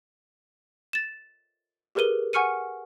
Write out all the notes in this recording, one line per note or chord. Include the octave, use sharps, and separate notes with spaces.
A6 E7
G4 G#4 A#4 B4 D#7 G7
F#5 G#5 C#6 F6 C#7 D#7